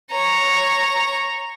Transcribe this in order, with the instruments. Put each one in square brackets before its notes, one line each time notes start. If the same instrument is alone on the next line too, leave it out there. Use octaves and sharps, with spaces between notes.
[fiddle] C#5 A#5